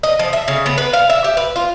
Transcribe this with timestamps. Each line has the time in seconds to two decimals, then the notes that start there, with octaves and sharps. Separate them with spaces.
0.03 D#5
0.19 F3
0.33 E5
0.48 C#3
0.66 B3
0.78 B4
0.93 F5
1.09 E5
1.24 G4
1.37 B4
1.56 F4